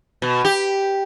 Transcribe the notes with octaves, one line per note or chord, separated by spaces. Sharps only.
B2
G4